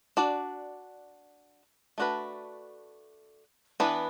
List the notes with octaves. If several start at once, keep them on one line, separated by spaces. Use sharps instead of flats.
D4 F#4 D5
A3 D4 F#4 B4
E3 B3 D4 B4